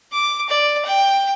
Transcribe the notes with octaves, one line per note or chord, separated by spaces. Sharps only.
D6
D5
G5